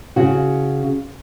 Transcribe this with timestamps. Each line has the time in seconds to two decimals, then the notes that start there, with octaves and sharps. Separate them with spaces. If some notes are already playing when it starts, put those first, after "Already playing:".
0.16 C#3 F#4